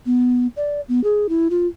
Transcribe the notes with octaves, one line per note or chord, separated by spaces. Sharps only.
B3
D5
B3
G#4
E4
F4